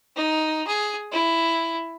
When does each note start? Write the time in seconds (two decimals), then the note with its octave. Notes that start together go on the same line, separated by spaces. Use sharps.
0.16 D#4
0.67 G#4
1.12 E4